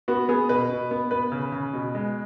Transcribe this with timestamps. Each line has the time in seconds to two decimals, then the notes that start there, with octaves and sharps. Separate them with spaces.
0.08 B3 F#4
0.29 B3 G#4
0.49 B2 B4
0.70 B2
0.91 B3
1.11 B3 B4
1.32 C#3
1.52 C#3
1.73 B2
1.95 G#3